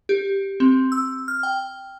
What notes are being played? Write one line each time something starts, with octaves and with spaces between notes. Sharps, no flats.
G4
C4
E6
F6
G5